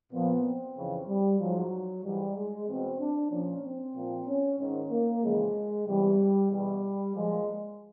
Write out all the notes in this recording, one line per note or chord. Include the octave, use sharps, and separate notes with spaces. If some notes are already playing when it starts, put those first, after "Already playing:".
A#2 F3 B3
C4
F2 C#3 E3
G3
G#2 F3 F#3
G#2 E3 G3
G#3
E2 B2 C4
D4
A#2 F3 C#4
C4
A#2 F3
C#4
G#2 D#3 C#4
A#3
F2 C#3 E3 G#3
E2 C3 E3 G3
E2 B2 G3
A#2 F3 G#3